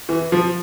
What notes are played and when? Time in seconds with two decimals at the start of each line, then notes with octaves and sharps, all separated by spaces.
0.09 E3
0.32 F3